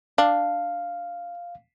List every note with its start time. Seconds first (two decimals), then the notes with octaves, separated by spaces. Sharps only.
0.18 D4 F5